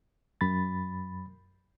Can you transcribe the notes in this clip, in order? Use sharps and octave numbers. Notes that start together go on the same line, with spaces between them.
F#2 B5 A6